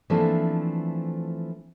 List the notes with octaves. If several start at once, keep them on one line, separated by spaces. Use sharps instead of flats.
E3 F3 A3 A#3 C4 D4